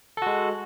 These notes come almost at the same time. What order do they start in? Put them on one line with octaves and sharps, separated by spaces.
A4 F#4 G#3